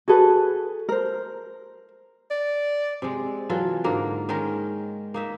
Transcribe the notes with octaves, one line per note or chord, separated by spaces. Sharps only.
F#4 G#4 A4 B4
A#4 C5
D5
C3 G#3
E3 F#3 F4 A4
G#2 D3 A#3 A#4
D#3 G#3 C#4 A#4
A#3 D#4 E5